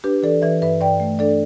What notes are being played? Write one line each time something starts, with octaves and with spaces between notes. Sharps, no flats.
D4 G4 B4
E3 A4 D5
E3 B4 E5
G2 B4 E5
G2 D5 G5
A3
D4 A4 D5